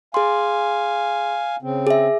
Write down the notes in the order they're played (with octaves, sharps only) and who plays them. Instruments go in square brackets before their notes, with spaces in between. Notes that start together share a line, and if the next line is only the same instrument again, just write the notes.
[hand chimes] G#4 C6 [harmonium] F5 G#5
[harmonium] C#3 C4
[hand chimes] G#4 E5